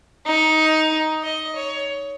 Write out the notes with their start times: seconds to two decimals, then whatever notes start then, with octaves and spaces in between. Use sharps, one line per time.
0.26 D#4
1.23 D#5
1.56 C#5